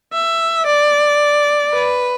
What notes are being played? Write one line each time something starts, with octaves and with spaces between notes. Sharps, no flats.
E5
D5
B4